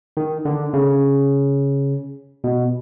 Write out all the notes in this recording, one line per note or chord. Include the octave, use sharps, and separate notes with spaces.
D#3
D3
C#3
B2